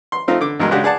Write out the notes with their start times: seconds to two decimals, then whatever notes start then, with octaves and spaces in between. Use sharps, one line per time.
0.12 C6
0.28 F3 A3 C4 D#4 F4
0.41 D3 D6
0.59 B1 G2 B2 G#3 A#4
0.71 C#3 G#3 D4 F#4 G4
0.84 G#4 D5 F#5 A5